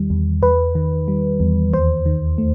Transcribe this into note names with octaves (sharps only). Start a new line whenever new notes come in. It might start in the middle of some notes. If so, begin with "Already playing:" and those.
Already playing: E2 D#3 G3
E2
E2 B4
D#3
G3
E2
D#2 C5
D#3
A3